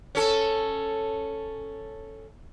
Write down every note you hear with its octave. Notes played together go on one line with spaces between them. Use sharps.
C#4 A4